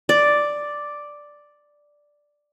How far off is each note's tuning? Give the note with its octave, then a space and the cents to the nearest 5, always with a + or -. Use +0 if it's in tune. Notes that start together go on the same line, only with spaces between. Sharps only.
D5 +0